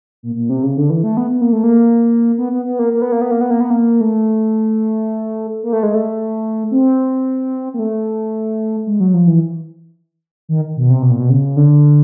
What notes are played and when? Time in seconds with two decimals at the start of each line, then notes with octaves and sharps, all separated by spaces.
0.23 A#2
0.35 A#2
0.50 C3
0.63 C#3
0.77 D3
0.90 E3
1.04 A3
1.17 B3
1.31 B3
1.41 A#3
1.53 A3
1.64 A#3
2.38 B3
2.52 B3
2.65 B3
2.79 A#3
2.93 A#3
3.02 B3
3.12 A#3
3.21 B3
3.31 A#3
3.41 B3
3.51 A#3
3.61 B3
3.70 A#3
4.01 A3
5.63 A#3
5.73 A3
5.83 G#3
5.95 A3
6.71 C4
7.74 A#3
7.79 A3
8.87 G#3
9.00 F#3
9.14 F3
9.27 E3
10.49 D#3
10.77 B2
10.90 C3
11.02 B2
11.11 A#2
11.19 B2
11.30 C#3
11.57 D3